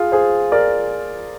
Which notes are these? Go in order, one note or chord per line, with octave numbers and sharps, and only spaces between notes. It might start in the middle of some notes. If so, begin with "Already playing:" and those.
Already playing: F4 G#4
G#4 C5
A#4 D5